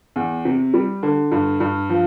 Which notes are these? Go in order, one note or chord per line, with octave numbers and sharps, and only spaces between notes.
E2
C3
G3
D3
G2
G2
F3